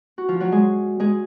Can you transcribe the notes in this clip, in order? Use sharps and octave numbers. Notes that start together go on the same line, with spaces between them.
F#4
F3 F4
F#3 F#4
G#3 G#4
G#3 G#4